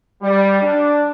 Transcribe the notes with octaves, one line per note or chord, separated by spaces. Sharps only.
G3
D4